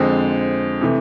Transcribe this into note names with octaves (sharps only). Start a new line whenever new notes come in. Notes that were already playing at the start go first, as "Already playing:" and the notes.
Already playing: F2 D3 G#3 C4
C3 E3 A3